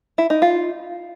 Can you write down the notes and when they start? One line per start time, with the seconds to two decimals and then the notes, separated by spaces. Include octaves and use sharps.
0.18 E4
0.30 D#4
0.42 F4